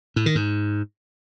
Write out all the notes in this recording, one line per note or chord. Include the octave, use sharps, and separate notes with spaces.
A2
D#3
G#2